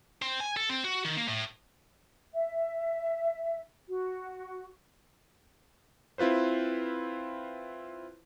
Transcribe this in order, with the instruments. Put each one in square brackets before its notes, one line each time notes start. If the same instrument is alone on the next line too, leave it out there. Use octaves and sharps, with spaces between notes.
[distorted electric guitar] C4
G#5
A4
C4
F#4
D#3
A#3
A2
[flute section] E5
F#4
[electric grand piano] C4 E4 F4 B4 C5